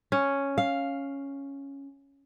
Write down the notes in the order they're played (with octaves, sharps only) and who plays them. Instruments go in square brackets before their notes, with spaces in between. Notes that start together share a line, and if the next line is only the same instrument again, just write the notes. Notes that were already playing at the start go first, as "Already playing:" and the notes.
[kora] C#4
F5